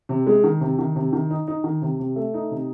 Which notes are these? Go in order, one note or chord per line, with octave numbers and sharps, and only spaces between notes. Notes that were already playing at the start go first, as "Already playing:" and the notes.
C3
G#3
D#3
C3
D#3
C3
D#3
D#4
D#4
D#3
C3
C3
A3
D#4
C3